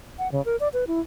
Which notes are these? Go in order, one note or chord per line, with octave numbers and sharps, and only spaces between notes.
F#5
C#3
A#4
D5
B4
E4